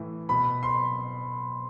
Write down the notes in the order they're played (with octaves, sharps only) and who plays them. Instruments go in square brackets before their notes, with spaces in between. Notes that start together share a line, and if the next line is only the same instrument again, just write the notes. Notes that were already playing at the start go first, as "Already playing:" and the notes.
Already playing: [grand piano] A2 E3
B2 B5
C6